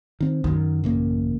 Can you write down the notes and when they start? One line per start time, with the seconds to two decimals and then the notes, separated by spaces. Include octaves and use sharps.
0.20 D#3 C4
0.44 F#2 D#3
0.84 A1 C#3 A#3